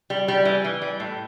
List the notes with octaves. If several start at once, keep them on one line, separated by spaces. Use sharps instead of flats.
G3
G3
E3
E3
G3
A2